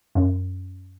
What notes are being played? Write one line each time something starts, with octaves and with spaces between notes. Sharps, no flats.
F#2